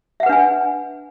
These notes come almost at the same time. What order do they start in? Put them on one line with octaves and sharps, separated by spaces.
E5 F#5 B4 D4 G#5